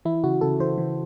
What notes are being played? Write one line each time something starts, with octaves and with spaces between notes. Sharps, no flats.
E3 E4
C#3 F#4
C#3 A4
E3 C5
E3